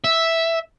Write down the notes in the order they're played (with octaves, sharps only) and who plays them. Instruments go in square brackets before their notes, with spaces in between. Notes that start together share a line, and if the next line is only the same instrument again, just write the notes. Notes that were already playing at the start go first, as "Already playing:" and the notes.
[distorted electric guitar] E5